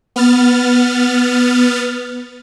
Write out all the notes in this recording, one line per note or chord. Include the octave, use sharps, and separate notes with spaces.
B3 F6 A6